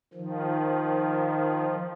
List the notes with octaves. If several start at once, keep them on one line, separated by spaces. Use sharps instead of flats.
D#3 F3